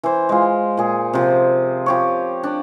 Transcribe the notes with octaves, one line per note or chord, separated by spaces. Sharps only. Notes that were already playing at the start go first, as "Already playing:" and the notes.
E3 C5
G#3 F4
A#2 G#4
C3 F3
F3 G4 C#5
D4